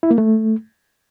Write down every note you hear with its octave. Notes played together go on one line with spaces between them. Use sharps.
E4
A#3
A3